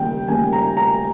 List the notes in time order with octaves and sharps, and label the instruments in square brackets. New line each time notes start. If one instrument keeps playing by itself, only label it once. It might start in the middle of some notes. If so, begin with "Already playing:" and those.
Already playing: [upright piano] D#2 C#3 G3 G5
D#2 C#3 G3 G#5
A#5
A#5